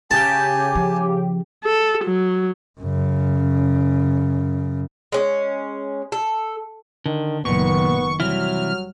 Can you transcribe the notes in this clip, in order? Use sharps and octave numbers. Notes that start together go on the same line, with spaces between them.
C#3 G4 G#5 A5
F3
A4
F#3
F#2 C#3
G#3 C#4
A4
D3 D#3
F#1 A#2 D#3 B3 C#6
C3 E3 F#3 G3 E4 F6